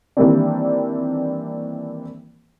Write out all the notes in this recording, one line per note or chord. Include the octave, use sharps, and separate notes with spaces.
D#3 E3 G3 A#3 C4 D4